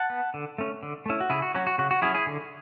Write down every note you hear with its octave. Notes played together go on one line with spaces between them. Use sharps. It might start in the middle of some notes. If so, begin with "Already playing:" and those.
Already playing: F#5 A5
B3
D3
A3 C#4
D3
A3 C#4 E4
F#4
C#3 E4 G#4
F#4
F#3 C#4 F#4
F#4
C#3 F#4
F#4
F#3 C#4 E4 G#4
E4 G#4
D3